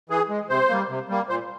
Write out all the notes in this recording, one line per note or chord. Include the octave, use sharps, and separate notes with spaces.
E3 G#4
G#3
C3 C5
G3 A#3
C3
G3 A#3
A#2 C5